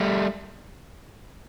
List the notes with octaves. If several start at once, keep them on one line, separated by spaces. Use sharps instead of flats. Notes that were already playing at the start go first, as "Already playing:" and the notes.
Already playing: G3 A3